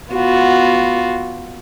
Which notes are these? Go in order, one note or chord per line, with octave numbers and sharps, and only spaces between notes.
B3 F4 F#4